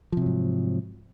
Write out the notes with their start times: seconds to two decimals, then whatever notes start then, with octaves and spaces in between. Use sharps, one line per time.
0.12 F3
0.17 C3
0.22 F#3
0.26 G#2